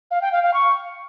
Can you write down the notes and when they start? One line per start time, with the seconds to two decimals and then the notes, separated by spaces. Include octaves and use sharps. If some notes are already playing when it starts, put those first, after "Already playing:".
0.11 F5
0.22 G5
0.32 F5
0.43 F5
0.54 C#6